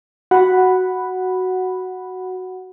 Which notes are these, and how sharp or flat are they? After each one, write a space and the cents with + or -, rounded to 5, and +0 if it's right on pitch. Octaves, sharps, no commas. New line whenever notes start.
F#4 +5 F#5 +0 B5 +0